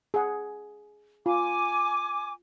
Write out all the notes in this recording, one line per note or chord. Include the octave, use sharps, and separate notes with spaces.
G#4 F#5
F4 G#5 D6